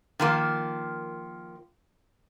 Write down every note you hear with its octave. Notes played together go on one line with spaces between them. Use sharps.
D#3 F3 A#3